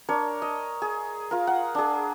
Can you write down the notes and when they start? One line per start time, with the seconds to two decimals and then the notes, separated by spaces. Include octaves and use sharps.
0.09 D4 A#4 C#5
0.42 D#5
0.82 G#4
1.31 F4 A#4
1.47 F#5
1.75 D4 G#4